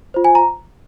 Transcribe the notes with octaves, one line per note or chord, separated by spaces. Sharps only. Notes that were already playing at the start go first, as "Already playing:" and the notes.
F4 C5
G#5
A#5